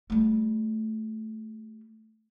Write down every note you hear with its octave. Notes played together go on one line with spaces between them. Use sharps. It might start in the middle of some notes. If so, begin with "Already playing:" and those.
G3 A3